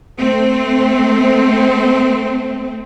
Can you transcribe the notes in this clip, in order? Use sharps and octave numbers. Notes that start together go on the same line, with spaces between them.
A3 C4